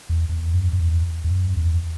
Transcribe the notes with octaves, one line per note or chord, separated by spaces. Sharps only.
E2
E2
F#2
F#2
E2
E2
F#2
E2